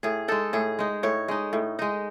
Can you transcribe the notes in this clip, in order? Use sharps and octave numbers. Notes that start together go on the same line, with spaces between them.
A2 G#4
G#3 D#4 A4
A2 G#4
G#3 D#4
A2 C#5
G#3 D#4
A2
G#3 D#4